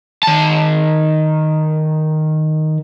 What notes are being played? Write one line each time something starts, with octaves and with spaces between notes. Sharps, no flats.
D#3 A5